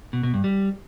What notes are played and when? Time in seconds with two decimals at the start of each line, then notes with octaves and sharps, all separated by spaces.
0.13 B2
0.23 B2
0.34 G2
0.44 G3